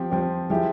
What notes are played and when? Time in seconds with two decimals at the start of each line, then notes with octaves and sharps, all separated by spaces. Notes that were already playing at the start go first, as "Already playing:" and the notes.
Already playing: F3 C4 G4
0.10 F3 C4 G4
0.50 F3 G#3 E4 G4